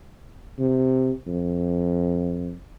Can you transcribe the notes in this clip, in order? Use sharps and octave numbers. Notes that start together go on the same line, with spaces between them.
C3
F2